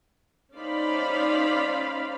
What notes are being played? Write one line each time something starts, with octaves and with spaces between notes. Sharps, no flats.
C#4 D#4 C5 D5 F5 B5